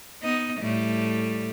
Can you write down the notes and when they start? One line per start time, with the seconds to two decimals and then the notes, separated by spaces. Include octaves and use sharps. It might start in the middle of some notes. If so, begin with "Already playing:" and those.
0.22 B3 D#4 D#5
0.61 A2 G3 A3